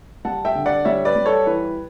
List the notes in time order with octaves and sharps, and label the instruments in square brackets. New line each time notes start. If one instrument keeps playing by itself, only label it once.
[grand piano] G3 F#5 A5
E5 G5
D3
D5 F#5
G3 C#5 E5
B4 D5
G3
A4 C#5
E3 B4